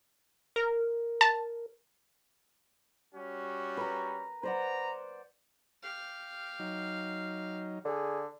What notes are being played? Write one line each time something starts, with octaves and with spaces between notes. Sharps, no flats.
A#4
A5
G3 C#4 F#4
B4 A#5
B4 C5 D5 F#5 A#5
G4 F5
F#3 D#4
D3 G#4